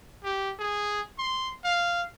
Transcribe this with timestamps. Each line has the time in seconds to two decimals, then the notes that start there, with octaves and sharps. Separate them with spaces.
0.24 G4
0.59 G#4
1.18 C6
1.64 F5